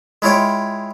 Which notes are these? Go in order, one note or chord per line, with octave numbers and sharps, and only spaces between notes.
G#3 E4 F4 C#5 G5